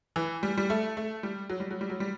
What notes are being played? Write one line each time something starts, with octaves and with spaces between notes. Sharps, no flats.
E3
G3
G3
A3
A3
G3
F#3
G3
F#3
G3
F#3
G3